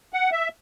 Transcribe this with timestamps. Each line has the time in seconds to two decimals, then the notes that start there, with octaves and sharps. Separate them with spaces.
0.13 F#5
0.32 E5